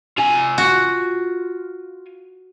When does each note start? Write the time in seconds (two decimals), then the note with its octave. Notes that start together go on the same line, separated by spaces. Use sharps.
0.18 F4 G#5
0.58 F#4